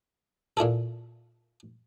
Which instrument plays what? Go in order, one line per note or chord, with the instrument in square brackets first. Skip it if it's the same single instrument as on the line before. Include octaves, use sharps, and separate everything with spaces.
[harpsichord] A#2 E4 G#4 A4